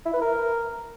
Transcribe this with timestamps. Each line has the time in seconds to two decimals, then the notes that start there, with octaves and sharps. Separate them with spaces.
0.05 E4
0.13 B4
0.21 A#4